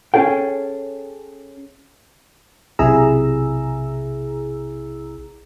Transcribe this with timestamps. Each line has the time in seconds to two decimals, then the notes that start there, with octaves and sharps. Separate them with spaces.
0.14 C#4 G#4 A4 G5
2.79 B1 C3 E4 G#4 A#5 E6